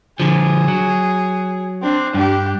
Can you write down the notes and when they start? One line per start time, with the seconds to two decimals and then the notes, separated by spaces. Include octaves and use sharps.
0.20 D3 F3 G#4
0.68 F#3
1.82 C4 D4
2.14 G2 D4 G4